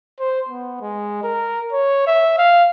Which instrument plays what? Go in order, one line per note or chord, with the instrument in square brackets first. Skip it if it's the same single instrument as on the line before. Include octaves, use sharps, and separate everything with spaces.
[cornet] C5
B3
G#3
A#4
C#5
E5
F5